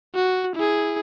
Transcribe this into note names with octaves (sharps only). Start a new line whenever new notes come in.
F#4
E4 G#4